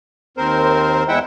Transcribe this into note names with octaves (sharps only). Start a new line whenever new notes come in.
D#2 C4 A#4 C5
E2 G#3 E4 E5 F#5 G5